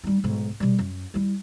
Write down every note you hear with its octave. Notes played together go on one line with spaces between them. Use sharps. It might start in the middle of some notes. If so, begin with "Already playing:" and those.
G3 D#4
B1 G#2
B2 G3
F#2
G3 E4